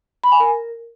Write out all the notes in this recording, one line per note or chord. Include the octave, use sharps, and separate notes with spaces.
B5
G#5
A#4